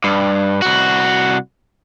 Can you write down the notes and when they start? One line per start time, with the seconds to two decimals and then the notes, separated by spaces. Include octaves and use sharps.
0.04 G2
0.62 C2 F#4